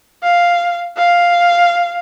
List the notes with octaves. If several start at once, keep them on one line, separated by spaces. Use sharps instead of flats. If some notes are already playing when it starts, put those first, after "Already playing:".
F5
F5